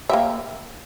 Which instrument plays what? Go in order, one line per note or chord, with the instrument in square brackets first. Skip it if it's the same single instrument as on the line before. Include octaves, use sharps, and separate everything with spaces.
[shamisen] A#3 G4 E5